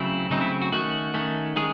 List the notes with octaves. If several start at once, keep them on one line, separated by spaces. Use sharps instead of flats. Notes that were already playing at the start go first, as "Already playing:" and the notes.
Already playing: C#3 F#3 A3 C4 E4
C#3 F#3 A3 C4 D#4
E4
F#4
D#3 A3 C#4 F#4
D#3 A3 C#4
D#3 G#3 C#4 G#4